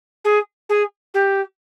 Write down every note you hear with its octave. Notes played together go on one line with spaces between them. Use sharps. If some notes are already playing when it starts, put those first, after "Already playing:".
G#4
G#4
G4